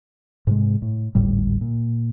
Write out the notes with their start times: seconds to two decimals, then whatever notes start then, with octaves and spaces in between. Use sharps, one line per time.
0.47 G#2 C3 G#3
0.82 A2
1.15 G#1 D2 A2 G3
1.61 A#2